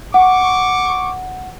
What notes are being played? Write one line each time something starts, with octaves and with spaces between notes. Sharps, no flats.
F#5 C#6 D6